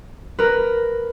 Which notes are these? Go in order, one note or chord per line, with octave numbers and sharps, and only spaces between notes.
A#4 B4